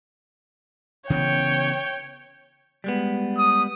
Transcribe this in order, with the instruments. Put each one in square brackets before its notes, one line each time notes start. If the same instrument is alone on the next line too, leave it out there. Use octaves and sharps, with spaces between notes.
[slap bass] C#3 E3 B3 [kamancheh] C#5 G5
[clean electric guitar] G3 G#3 B3
[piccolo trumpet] D#6